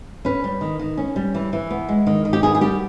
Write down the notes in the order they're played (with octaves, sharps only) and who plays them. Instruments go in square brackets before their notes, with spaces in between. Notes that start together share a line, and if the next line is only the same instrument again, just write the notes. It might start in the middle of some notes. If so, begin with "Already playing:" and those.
[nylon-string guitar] C#4 B4
G3
D#3
D#3
C#4
G3
E3
E3
B3
G#3
D#3
D#3
G4
B3 G#4
G#4
G3 G4